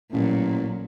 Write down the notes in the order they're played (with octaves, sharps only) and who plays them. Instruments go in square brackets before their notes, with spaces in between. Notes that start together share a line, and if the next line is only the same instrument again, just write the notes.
[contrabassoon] A1 [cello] A#2 F#3